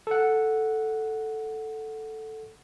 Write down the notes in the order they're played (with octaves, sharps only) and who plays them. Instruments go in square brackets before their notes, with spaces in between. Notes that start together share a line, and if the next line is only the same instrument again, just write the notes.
[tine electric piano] A4 F#5